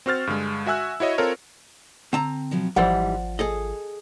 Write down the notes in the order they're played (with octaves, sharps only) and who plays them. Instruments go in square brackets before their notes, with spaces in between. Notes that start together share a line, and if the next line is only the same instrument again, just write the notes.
[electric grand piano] C4 F#4 C5 F6 A6
G2 D3 G#3
F#4 E5 G#5 E6 F#6
E4 F#4 C#5 D#5 E5
C4 F4 A4 A#4 C#5
[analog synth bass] D3 [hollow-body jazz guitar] C4 A5 A#5
[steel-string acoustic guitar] B2 F3 F#3
[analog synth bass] G#1 [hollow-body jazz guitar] G#2 E3 G3 [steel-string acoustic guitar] F3 [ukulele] C5 D5 F#5
[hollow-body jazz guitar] G#4 A4 D#5